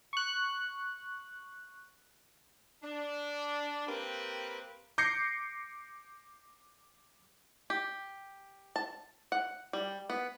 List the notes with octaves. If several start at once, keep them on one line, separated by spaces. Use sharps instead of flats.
C#6 F#6
D4
A#3 C4 G4 A#4 B4
D6 G6 A#6 C7 C#7
G4
A5
F#5
G3
B3